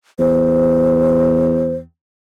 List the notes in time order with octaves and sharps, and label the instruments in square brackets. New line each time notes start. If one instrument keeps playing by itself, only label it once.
[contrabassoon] E2 [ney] C5